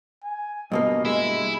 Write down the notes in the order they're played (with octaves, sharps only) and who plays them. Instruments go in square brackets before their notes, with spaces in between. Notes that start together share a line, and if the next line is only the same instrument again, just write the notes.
[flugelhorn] G#5
[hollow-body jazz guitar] G2 B2 A#3 [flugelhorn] D#5
[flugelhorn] G#3 [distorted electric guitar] E4